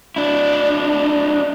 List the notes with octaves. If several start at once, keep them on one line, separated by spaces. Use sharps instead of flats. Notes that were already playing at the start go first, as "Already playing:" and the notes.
D4 E4